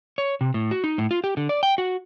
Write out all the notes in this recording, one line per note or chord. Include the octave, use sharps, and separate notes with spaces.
C#5
C3
A2
F#4
D#4
A2
F4
G4
D3
D5
G5
F#4